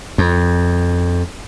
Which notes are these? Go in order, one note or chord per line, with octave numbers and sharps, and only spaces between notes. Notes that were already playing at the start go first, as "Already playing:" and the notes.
F2